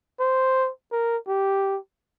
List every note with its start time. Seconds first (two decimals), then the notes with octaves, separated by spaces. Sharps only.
0.20 C5
0.92 A#4
1.28 G4